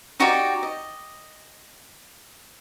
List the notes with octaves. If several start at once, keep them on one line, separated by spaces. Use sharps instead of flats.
D#4 F#4 G4 D5
D#5